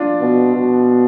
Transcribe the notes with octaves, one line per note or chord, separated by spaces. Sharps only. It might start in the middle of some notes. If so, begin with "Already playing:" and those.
Already playing: D4 F4
B2
B2